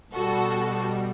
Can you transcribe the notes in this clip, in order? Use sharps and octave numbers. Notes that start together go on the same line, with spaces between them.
B2 G3 F#4 A4